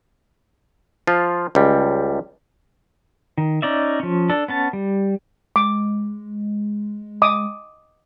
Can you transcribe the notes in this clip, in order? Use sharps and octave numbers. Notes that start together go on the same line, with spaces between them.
F3 F4
C#2 G3
D#3
C#4 D#4 D5 E5
F3 C#4
D4 A4
B3 C#4 A5
G3
G#3 D6
D#5 D6 D#6